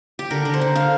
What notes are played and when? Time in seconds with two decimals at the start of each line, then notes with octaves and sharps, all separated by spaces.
0.19 G4
0.31 D3 A#4
0.45 D3
0.54 C5
0.61 D3
0.76 D3 F5